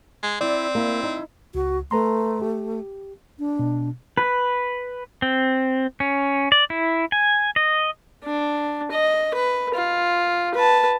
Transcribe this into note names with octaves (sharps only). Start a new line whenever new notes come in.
G#3
C4 E4 D5
A#3 E4
D#4
C#2 F#4
A3 B4 A#5 C6
G4
D4
B2
B4
C4
C#4
D5
E4
G#5
D#5
D4
D#5
B4
F4
B4 A5